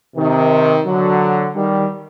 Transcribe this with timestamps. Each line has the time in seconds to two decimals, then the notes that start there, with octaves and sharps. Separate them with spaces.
0.16 C3 D#3
0.86 D3 F#3
1.55 D#3 G3